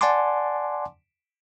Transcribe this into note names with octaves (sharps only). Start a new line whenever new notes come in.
D5 F#5 G#5 A5 C6 D6